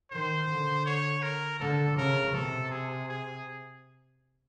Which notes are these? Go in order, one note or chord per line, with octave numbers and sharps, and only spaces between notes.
D#3 C5
D3
C#5
A#4
D3 A4
C#3 A#4
C3 A4
G#4
G#4